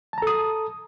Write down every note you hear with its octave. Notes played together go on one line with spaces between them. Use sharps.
A4 A5 A#5 D#6